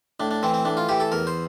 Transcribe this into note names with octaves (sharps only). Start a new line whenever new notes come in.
A2 D4
D4
E3 C4
C4
A2 D4
F4
E3 G4
A4
E2 A#4
C5